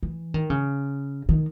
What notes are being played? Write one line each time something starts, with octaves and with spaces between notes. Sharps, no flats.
E3
D#3
C#3
D#3